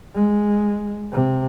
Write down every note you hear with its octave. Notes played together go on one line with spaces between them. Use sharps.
G#3
C3